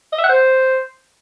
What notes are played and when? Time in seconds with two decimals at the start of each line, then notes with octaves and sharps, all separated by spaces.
0.12 D#5
0.18 E5
0.24 F#5
0.29 C5